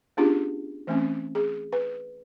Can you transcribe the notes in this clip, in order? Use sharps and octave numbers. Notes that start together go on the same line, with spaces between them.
B3 C#4 D4 F4 G4 G#4
E3 A3 C4 C#4
G#4
B4